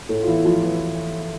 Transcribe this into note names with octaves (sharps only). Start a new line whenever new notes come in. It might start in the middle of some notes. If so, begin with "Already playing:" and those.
A2 A3
F4
E3 E4
F3 F4
E3 E4